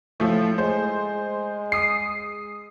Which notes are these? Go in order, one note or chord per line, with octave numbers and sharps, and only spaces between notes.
A2 F3 A3
G#3 C5
D#6 C7